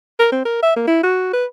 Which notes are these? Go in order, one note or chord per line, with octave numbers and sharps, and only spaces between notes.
A#4
C4
A#4
E5
A#3
E4
F#4
B4